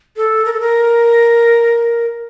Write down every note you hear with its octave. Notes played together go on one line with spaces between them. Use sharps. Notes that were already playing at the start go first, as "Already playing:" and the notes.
A4
A#4
A4
A#4